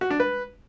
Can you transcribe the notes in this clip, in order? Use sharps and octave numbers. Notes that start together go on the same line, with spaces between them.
F#4
D4
B4